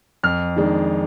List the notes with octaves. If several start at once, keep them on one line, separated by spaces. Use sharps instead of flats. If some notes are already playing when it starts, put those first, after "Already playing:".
F2 F6
D#3 G#3 D4